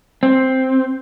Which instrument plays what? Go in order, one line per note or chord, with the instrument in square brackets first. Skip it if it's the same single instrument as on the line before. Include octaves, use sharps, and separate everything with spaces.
[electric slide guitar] C4